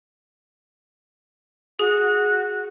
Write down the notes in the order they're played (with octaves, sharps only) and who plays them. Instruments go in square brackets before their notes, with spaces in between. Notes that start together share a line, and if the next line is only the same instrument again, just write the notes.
[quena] F#4 [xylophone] G#4